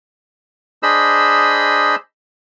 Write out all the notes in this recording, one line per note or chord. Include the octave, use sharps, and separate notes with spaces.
D4 G#4 C5 D#5 B5 E6